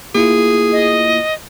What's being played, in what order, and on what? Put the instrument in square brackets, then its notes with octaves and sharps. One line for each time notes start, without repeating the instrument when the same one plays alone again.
[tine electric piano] A#3 E4 F4 [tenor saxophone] G#4
[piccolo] D#5